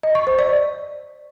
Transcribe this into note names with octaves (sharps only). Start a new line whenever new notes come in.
D#5
C#6
C5
D5